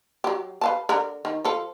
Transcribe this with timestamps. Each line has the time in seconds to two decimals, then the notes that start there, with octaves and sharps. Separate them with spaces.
0.24 F#3 G4
0.61 B4 F5 A5
0.89 D3 A#4
1.25 D#3
1.45 F3 A4